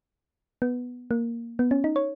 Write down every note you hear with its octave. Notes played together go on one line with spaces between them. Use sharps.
B3
A#3
B3
C#4
D#4
C#5